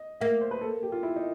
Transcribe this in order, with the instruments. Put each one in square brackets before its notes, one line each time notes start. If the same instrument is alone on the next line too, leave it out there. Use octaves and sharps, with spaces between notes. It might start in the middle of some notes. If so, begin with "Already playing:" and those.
Already playing: [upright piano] D#5
[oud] A#3 [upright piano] E5
[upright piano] C5
B4
A4
G4
F4
E4
D#4